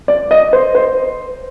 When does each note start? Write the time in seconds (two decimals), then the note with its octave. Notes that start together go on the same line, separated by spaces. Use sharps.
0.08 D5
0.31 D#5
0.53 C5
0.75 C5